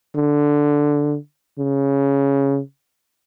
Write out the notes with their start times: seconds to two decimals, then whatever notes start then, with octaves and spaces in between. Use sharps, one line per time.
0.16 D3
1.59 C#3